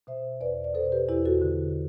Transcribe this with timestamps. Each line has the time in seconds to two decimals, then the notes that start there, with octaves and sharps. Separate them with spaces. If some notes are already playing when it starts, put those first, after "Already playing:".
0.07 B2 C5 E5
0.41 E2 B4 D5
0.64 D5
0.74 B2 A4 C5
0.92 G4 B4
1.08 E2 E4 G4
1.25 F#4 A4
1.42 D3